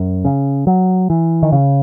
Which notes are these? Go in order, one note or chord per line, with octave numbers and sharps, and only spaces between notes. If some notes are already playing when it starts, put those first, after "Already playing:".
Already playing: F#2
C#3
F#3
E3
D#3
C#3